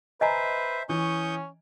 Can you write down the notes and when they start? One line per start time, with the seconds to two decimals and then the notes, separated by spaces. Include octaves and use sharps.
0.21 B4 C5 D#5 E5 G#5 A#5
0.89 E3 C#4 C#6 D#6 G6